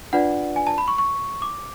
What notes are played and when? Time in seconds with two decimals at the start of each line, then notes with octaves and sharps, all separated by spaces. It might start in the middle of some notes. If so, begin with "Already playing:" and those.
0.13 D4 F4 B4 D5 F#5
0.56 G#5
0.67 A5
0.78 B5
0.88 C#6
0.98 C#6
1.42 D6